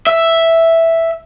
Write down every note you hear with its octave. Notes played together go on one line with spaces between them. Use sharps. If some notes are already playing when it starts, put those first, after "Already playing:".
E5